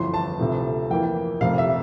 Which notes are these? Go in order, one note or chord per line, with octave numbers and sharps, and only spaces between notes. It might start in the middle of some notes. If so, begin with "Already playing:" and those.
Already playing: G1 F2 E3 C6
A5
D2 C3 F3 A3
F2 E3 A#3 G5
F1 F2 C3 F5
E5